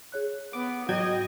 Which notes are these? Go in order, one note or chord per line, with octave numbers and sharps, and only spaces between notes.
G#4 C#5 F#6
B3 D6
G#2 F#3 D#5 G5 G#6